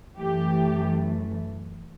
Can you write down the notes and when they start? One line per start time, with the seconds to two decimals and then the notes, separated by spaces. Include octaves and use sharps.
0.16 F#2 E3 A3 G4